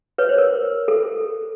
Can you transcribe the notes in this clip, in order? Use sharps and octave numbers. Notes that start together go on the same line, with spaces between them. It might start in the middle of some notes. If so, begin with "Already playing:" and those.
B4 C#5
C5
A#4
A4